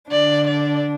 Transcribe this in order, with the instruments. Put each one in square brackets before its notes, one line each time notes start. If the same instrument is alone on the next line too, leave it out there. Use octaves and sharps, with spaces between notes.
[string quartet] D3 D4 [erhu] D5
[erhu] D5